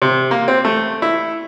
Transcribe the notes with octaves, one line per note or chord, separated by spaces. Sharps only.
C3
A#3
C4
A3
E4